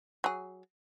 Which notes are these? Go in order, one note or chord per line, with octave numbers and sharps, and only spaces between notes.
F#3 G#4